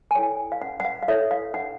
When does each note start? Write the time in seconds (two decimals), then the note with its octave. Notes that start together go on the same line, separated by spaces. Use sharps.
0.11 G#5
0.15 E4 A4 C#5 G5
0.52 F5
0.61 C#4 F#5
0.80 F#5
0.85 F5
1.03 F5
1.08 E4 A4 C#5 E5
1.31 F5
1.54 D4 F#5